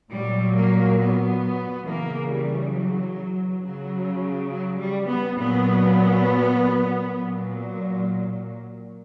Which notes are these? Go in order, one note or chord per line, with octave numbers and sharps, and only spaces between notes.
A#2 F#3 G3
A#3
B3
C#3 E3 A#3
G3
F#3
C#3 F#3
F#3
G3
B3
A#2 F#3 B3
A#2 F#3